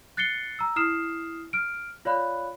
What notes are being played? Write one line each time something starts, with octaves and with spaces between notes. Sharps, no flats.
F#6 A6 C7 C#7 G7
A#5 E6
E4 D#6 F6 C7 E7
F6 D7
F4 C#5 D5 F5 B5 F#6